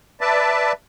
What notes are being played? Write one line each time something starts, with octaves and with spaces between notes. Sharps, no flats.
B4 D5 E5 A5